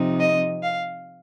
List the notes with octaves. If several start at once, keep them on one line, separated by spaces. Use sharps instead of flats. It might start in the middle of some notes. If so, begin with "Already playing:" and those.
Already playing: C3 F3 C4 D#4
D#5
F5